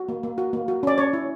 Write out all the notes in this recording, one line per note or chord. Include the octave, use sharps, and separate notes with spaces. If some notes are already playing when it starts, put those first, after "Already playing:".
Already playing: F#4
A#3
A#3
F#4
A#3
F#4
C#4 D5
C#4 C#5
E4